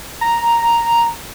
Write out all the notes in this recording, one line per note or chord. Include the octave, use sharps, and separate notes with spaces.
A#5